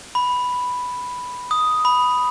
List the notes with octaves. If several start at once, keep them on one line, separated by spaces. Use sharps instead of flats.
B5
D#6
B5